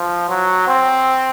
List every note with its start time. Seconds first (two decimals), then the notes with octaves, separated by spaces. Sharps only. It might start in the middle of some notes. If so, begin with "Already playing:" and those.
Already playing: F3
0.29 F#3
0.68 C4